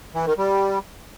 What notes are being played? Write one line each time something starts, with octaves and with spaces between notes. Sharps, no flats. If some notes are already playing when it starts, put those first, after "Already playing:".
E3
D#3
G3